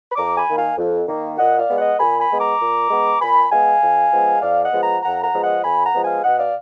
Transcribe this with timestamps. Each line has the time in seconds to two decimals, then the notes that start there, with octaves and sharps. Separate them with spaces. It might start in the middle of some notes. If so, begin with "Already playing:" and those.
0.11 B5
0.16 F2 A#5 D6
0.37 G#5 B5
0.46 D#3 A#3
0.56 F5 G#5
0.78 F2
1.07 D#3 A#3
1.38 A#2 D#5 F#5
1.58 D5 F5
1.68 G#3 B3
1.78 D#5 F#5
1.99 A#2 G#5 B5
2.19 G#5 B5
2.29 G#3 B3
2.39 A#5 D6
2.59 A#2
2.89 G#3 B3
3.20 A#2 G#5 B5
3.50 G#3 B3 F5 G#5
3.81 F2
4.12 F3 G#3 B3
4.41 F2 D5 F5
4.62 D#5 F#5
4.72 F3 G#3 B3
4.82 F#5 A#5
5.03 F2 F#5 A#5
5.23 F#5 A#5
5.33 F3 G#3 B3
5.44 D#5 F#5
5.63 F2 G#5 B5
5.84 F#5 A#5
5.94 F3 G#3 B3
6.04 F5 G#5
6.24 B2 D#5 F#5
6.39 D5 F5